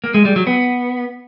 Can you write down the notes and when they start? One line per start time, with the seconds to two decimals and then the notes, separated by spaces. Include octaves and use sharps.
0.04 A#3
0.14 G#3
0.25 G3
0.36 F#3
0.47 B3